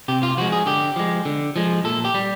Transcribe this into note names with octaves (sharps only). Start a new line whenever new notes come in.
C3 G4
F4
F3 G#3 F#4
G#4
D3 G4
F3 G#3
D3
F3 G#3
A#2 A4
G4
G3